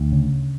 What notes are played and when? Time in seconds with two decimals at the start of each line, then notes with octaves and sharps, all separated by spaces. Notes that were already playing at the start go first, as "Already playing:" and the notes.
Already playing: D2
0.12 C#3